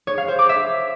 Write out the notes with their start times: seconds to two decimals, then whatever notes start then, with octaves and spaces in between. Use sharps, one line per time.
0.07 C#5
0.18 F5
0.28 C5
0.39 D6
0.49 E5